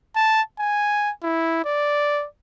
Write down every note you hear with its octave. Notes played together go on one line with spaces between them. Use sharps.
A5
G#5
E4
D5